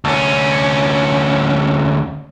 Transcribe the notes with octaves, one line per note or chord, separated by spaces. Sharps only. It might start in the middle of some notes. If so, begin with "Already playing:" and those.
D2 C#4